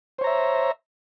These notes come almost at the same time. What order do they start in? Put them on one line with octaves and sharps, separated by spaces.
C5 C#5 A#5 E5